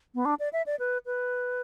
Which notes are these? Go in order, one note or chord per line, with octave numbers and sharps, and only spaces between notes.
B3
D4
D5
E5
D5
B4
B4